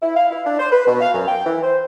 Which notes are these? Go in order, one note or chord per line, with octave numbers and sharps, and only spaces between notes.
E4
F5
E4
D4
C5
B4
B2
F5
F#2
G5
E3
C5